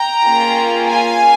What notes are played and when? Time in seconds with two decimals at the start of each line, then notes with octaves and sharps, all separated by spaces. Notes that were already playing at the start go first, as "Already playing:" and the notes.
Already playing: G5 A#5
0.25 A#3 C#4 F4 G#4
0.89 F5 G#5